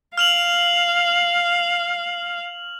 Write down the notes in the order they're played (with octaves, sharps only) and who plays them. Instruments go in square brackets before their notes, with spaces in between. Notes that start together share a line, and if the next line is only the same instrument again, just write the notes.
[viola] F5 [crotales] F6 F7 F#7